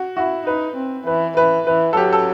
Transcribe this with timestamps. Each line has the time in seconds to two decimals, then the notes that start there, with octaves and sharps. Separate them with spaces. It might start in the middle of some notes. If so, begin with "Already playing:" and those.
Already playing: F#4
0.17 E4 F#4
0.47 D#4 B4
0.77 C4
1.07 E3 B4
1.37 E3 B4
1.67 E3 B4
1.93 A4
1.97 F#3 G4
2.12 A4